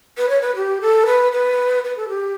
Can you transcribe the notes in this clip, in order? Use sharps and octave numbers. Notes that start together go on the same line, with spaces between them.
B4
C#5
B4
G4
A4
B4
B4
B4
A4
G4